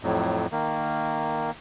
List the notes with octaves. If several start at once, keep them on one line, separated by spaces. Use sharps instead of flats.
F2 A2 F#3
D#3 A#3